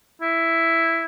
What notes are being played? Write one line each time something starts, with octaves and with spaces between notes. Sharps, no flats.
E4